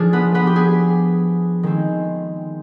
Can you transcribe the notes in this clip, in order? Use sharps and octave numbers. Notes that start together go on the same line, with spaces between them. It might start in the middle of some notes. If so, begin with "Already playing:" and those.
Already playing: F3 D4 G#4
B3 B4
B3 B4
G4
G#4
D#3 G#3 C4